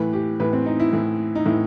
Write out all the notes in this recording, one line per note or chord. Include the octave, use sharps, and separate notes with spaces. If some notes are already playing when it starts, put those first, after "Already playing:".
Already playing: A2 E3 B4
G4
A2 E3 B4
C4
D#4
E4
A2 E3
D#4
A2 E3 E4